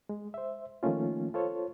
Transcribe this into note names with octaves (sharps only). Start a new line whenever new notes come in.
G#3
C5 E5
D#3 F3 A3 A#3 C#4 F4
F4 A4 C5 C#5